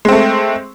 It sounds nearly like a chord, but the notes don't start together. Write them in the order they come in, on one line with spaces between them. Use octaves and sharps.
G#3 C4 A3